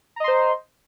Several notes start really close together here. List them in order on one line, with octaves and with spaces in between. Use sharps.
A#5 D#5 C6 C5